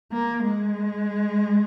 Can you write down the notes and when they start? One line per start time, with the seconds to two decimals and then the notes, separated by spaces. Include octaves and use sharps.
0.13 A#3
0.43 G#3